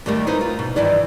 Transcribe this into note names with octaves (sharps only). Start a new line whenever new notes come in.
D#2 G3 A3 A#4
D#4 E4 B4 C5
F4
B2
G2 D#3 E3 E4 D5